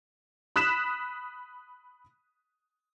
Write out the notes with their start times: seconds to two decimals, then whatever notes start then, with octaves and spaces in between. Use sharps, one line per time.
0.56 B5 D#6 F#6 B6 E7